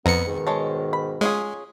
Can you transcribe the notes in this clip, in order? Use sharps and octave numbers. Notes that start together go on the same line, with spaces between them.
F2 B3 A#5 C#7
G#2 B2 D#3
G#3 C#5 A5
B5
G#3 C#4 F4 G#4